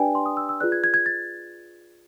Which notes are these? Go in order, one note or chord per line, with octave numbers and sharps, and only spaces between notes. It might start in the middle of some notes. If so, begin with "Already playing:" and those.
Already playing: D4 G4 B4 D5 G5 G#5
C6
D#6
E6
E6
F4 G#4 B4 D5 F#6
G#6
G#6
G#6
A6